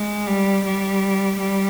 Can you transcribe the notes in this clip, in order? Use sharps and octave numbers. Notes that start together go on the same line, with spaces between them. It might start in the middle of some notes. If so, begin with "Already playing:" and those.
Already playing: G#3
G3
G3
G3